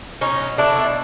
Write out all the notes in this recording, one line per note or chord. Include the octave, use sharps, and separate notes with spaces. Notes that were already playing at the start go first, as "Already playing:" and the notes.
B2 C#4 D#4
F#3
A3 D4 E4
B2